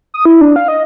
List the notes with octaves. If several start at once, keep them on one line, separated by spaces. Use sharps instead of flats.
D#6
E4
D4
F5
D#5